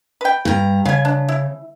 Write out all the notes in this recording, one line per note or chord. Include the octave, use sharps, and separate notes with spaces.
B4 G5
G2 A#5
C#3 F5 G#5
D4
E4